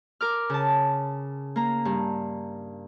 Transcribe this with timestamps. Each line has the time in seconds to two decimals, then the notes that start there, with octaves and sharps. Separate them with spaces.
0.21 A#4 D6 F6
0.50 C#3 A5
1.56 A#3 A#5
1.85 G2